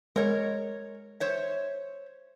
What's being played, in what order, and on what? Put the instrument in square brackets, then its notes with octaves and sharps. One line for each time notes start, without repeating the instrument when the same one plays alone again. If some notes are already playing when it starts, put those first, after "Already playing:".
[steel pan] G#3 [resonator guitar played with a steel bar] A#4 C#5
[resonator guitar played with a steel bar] C5 C#5 E5